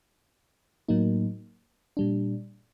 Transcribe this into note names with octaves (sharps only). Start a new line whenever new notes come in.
A2 F#3 A#3 D#4
A#2 G3 D4